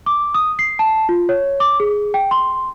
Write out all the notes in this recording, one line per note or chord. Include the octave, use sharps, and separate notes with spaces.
D6
D#6
C7
A5
F4
C#5
D6
G#4
G5
C6